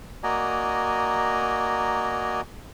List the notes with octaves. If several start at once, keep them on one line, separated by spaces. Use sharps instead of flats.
A#3 F#4 D5 D#5 G#5 A#5